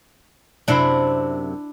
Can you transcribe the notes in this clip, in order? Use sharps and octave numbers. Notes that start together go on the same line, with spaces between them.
F#2 C3 D4 E4 C6